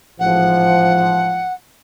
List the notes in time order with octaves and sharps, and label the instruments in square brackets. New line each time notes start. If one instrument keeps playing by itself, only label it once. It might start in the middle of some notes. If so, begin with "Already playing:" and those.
[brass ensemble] A1 G#2 F3 [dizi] F#5